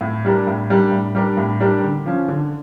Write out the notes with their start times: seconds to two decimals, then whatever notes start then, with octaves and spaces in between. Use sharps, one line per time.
0.01 A2
0.25 G3 D4 G4 A#4
0.47 A2
0.70 G3 D4 G4 A#4
0.92 A2
1.15 G3 D4 G4 A#4
1.37 A2
1.60 G3 D4 G4 A#4
1.84 D3
2.06 F3 C#4
2.28 D3